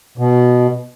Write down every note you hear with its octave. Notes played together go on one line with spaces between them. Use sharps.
B2